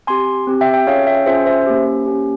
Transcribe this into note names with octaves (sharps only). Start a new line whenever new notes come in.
C4 G4 G#5 C6
C4 G4
E5 G5
E5 G5
C#4 F4 G#4 C#5 F5
E5 G5
C#4 F4 G#4 C5 E5
C5 E5
A#3 C#4 G4
A#3 C#4 G4